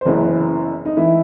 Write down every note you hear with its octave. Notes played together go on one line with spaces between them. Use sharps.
C5
F#1 F#2 E3 B3 B4
D#4
E3 E4